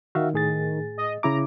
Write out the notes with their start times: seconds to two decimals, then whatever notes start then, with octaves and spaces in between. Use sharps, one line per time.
0.15 D#3 F#4 E5 F5
0.34 A2 G#4 A6
0.97 D#5
1.23 C#3 E4 A#5 D6